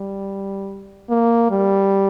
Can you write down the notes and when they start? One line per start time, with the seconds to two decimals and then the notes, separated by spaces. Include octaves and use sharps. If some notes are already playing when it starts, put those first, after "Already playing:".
Already playing: G3
1.10 A#3
1.51 G3